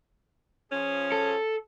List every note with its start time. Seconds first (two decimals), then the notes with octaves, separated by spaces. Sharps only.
0.72 F3 C#4 G#4
1.12 A4